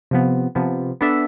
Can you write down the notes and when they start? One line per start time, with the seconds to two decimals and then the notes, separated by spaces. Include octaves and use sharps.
0.11 C3 F3 B3
0.55 C3 F3 B3
1.01 B3 D4 A4 E5